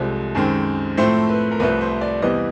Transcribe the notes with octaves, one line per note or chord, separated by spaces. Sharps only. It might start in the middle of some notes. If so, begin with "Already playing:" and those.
Already playing: C2 C3 F3 G#3 A4
F#2 D#3 G#3 C4
A2 F3 A3 C4 C5
B4
A#4
C2 C3 F3 A3 B4
C5
D5
E2 C3 E3 G3 D#5